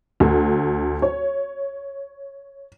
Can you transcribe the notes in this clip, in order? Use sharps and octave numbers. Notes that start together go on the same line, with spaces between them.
D2
C#5